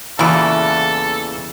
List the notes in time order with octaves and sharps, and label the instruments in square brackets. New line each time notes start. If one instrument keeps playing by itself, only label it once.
[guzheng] E2 [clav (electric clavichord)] A#2 C#3 E3 [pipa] E4 F#4 [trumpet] A4